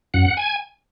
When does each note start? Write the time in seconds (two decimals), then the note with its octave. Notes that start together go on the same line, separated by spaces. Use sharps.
0.14 F#2 F#5
0.37 G#5